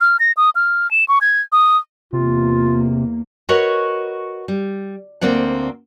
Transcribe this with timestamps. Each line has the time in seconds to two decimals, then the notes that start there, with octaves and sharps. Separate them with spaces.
0.01 F6
0.20 A#6
0.37 D#6
0.55 F6
0.91 E7
1.08 C#6
1.21 G#6
1.52 D#6
2.13 E2 C3 A#3 F4
3.49 F#4 A#4 B4 C#5 D#5 F#5
4.48 G3
5.21 D2 A#3 C4 D5 F#5